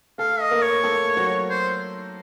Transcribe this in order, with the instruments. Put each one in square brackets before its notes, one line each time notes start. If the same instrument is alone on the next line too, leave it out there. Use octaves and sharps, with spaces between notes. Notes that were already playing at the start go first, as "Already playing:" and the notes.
[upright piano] A3 A4 [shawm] F5
[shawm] D#5
[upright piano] A#3 A#4
[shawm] C#5
[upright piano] A3 A4
F#3 F#4
[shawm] C5